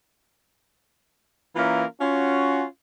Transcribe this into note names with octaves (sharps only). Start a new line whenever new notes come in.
E3 A#3 C#4 F4 A#4 E5
C#4 F4 F#4